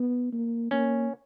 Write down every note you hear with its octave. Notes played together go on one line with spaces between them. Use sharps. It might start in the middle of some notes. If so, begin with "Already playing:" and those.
Already playing: B3
A#3
A#3 C#4